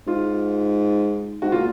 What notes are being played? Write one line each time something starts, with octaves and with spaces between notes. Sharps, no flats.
G#2 F4
G#2 F#4
A#2 F4